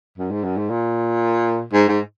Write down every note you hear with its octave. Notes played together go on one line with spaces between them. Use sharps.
F#2
G#2
F#2
G#2
A#2
G#2
G#2